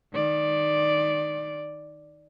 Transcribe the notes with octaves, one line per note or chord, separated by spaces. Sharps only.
D#3 D5